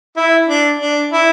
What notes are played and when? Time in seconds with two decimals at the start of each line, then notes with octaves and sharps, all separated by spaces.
0.16 E4
0.48 D4
0.80 D4
1.12 E4